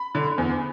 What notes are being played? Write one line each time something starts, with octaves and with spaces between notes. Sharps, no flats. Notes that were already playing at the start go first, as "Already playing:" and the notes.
Already playing: B5
D3
E2